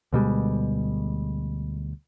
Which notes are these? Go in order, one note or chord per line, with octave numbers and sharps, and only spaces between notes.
D2 B2 G3 G#3